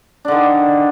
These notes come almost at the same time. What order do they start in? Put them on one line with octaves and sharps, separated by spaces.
D4 D3 D#3